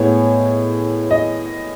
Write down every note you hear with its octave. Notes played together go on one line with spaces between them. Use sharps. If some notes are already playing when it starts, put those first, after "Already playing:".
Already playing: A2 G#3 B3 C#5
D#5